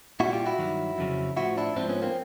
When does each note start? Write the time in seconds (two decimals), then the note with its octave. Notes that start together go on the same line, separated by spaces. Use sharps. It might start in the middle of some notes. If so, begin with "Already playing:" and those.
0.20 A#2 G3 E4 F#4
0.33 F4 G4
0.46 E4 F#4
0.59 G2 D#3 F#3
0.98 F2 C#3 F#3
1.37 A2 F3 E4 F#4
1.57 D4 E4
1.76 G#2 F3 C4 D4
1.89 B3 C#4
2.02 A#3 C4